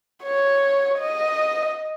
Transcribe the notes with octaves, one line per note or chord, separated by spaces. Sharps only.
C#5
D#5